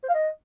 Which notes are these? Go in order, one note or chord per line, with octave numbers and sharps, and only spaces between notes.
C5
F5
D#5